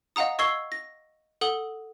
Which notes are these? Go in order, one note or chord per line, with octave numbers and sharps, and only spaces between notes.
D#5 F5 F#5 A#5 D#6
D#5 C#6 E6 G#6 C7 G7
A#6
A4 F#5 D#6 G7